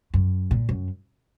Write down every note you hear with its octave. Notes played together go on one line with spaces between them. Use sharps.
F#2
A#2
F#2